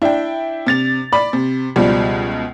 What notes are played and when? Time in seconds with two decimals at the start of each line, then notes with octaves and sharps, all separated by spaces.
0.02 D4 E4 G5
0.66 C3 A6 F7
1.13 D5 B5
1.33 C3
1.76 C#2 B2 F3 G3